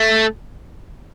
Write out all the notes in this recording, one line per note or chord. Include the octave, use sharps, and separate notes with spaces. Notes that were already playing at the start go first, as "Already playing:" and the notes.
Already playing: A3